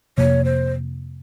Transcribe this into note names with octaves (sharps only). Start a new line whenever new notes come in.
F2 C3 F3 A#3 C#5
C5